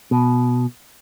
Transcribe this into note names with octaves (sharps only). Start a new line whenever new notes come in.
B2